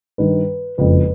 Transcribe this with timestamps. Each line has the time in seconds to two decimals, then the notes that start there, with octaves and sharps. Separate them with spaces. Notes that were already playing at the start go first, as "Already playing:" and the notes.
0.18 G2 D#3 G3 B4
0.78 F#1 F2 C#3 F3 G#3 B4